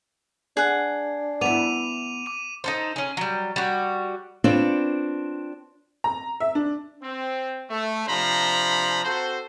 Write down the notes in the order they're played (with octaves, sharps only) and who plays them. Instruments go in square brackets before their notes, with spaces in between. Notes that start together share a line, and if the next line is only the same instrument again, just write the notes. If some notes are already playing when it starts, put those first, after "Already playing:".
[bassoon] D4 [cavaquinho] G#4 F#5
[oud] B3 E4 [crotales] D6 D#7 F7
[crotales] D6 D#7
[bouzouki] D#4 A4 C5
C#4 G#4
F#3 G3
G3 F#4
[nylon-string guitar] C4 D4 F4 B4 C#5 D5
[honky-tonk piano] A#5
E5
D4
[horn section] C4
A3
C3 F3 D4 C5 A#5 B5
C4 F#4 A4 C5